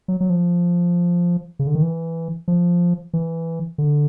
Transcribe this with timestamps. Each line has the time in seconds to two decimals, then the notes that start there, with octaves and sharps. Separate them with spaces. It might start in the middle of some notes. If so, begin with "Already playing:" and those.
0.08 F#3
0.20 F#3
0.30 F3
1.59 C#3
1.67 D3
1.75 D#3
1.82 E3
2.48 F3
3.13 E3
3.78 D3